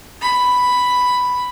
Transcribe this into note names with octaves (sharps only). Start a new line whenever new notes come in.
B5